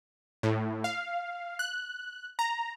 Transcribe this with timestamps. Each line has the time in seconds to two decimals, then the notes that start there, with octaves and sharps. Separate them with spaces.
0.43 A2
0.84 F5
1.59 F#6
2.39 A#5